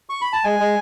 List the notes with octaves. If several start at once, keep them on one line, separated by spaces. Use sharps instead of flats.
C#6
B5
A5
G#3 G#5
G#3